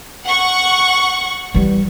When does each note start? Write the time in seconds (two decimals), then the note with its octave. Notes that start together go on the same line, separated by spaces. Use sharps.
0.25 F#5 C#6
1.54 E3 G3